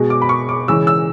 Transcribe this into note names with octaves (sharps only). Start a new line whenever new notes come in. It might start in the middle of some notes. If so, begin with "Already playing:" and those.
Already playing: B2 G#3
D6
B5
C#6
D6
C#3 E3 G#3 E6
E6